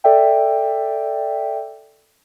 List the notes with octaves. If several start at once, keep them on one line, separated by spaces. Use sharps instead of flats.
A4 D5 E5 G5